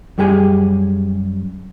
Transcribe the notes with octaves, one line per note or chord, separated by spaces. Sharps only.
F#2 G3 G4 G#4 G#5